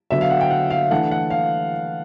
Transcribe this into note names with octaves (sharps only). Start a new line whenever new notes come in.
D3 F#3 B3 E5
F5
F#5
G5
F#5
F5
E3 A3 D4 F#5
F#5
F5